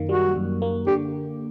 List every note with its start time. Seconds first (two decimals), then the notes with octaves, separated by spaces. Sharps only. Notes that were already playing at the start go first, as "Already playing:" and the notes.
Already playing: F#2 D#3 A#3
0.09 G3 F#4
0.36 F#2
0.62 A#3
0.87 D3 G4